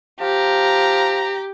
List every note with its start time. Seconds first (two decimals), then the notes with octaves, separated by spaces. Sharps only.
0.20 F3 G4 A#5